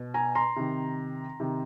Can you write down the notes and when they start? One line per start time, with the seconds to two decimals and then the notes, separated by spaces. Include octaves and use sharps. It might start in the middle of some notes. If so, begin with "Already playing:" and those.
Already playing: B2
0.14 G#5 A#5
0.35 A#5 C6
0.56 C3 D#3
1.40 C3 D#3